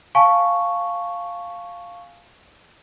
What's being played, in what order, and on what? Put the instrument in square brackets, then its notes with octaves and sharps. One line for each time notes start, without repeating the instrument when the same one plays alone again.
[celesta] F5 G#5 A5 C#6